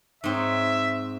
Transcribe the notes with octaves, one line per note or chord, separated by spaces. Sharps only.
G#2 C4 C#5 E5